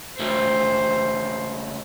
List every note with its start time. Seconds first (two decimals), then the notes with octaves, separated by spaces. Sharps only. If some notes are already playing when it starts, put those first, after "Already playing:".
0.20 C#2 A3 C5